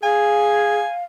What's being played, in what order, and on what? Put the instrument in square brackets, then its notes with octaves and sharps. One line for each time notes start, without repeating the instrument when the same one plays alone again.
[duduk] G#4 [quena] F5 [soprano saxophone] G#5